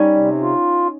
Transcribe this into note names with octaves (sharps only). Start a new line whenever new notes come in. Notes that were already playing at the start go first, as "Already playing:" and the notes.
Already playing: G3 C#4 D#4
C3
F4